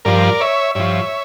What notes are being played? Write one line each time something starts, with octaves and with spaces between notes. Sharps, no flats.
G2 F3 A#4 D5
C#5 E5
G2 F3 C#5 E5